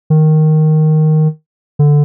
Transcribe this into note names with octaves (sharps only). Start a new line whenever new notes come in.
D#3
D3